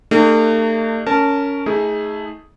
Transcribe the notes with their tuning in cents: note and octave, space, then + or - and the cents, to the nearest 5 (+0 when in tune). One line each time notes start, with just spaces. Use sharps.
A3 +45 D#4 -45 G#4 -40
C#4 +15 A#4 -15 A5 +0
A3 +0 D#4 +30 G#4 +0